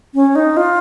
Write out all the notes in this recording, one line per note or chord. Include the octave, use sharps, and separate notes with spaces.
C#4
D#4
F4